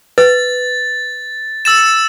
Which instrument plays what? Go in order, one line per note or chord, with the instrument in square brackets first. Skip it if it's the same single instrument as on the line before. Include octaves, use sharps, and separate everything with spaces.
[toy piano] B4 [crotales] A6
[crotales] E6 A6 E7